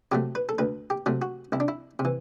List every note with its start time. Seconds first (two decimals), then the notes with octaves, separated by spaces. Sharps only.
0.12 C3 F#3 A3 G4
0.35 B4
0.49 A4
0.58 D2 B4
0.90 G4
1.06 C3 F#3 A3
1.22 F#4
1.52 C2 E4
1.60 D4
1.68 E4
1.99 C3
2.05 E3